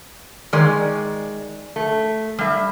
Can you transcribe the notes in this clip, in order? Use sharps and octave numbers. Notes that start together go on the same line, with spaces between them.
D#3 G#3 D5
A3
G3 E5